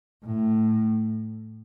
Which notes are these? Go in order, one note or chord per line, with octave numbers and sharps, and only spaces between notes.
A2